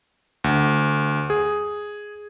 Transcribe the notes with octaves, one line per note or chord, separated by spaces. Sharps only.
D2
G#4